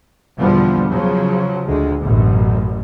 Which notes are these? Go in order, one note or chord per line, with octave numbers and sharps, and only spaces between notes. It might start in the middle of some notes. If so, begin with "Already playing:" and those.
E2 B2 D3 F3 G3 B3
C#3 F3 F#3
D2 G#3
A1 F#2 B2